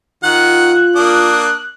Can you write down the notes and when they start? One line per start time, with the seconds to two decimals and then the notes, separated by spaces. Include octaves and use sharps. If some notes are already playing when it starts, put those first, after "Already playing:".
0.23 D#3 F4 F#5 F#6
0.96 A#3 D4 D#6